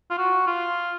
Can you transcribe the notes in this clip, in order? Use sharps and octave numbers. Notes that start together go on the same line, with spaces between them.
F4
F#4
F4